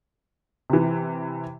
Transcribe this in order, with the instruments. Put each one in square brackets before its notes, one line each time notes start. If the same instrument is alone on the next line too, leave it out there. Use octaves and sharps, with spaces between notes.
[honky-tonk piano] C3 E3